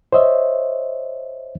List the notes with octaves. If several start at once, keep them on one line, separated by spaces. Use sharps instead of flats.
C5 C#5 D#5 E5